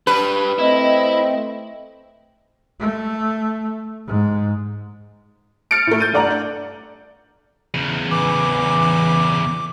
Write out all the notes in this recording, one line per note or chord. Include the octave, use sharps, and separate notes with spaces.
G2 G3 B4
A3 C4 E4 D#5
A3
G#2
F6 A6 C#7 D7
A2 A3
G6 A6 D#7
G2 A4 D5 F#5 A#5
D4
E2 C#3
E3 D6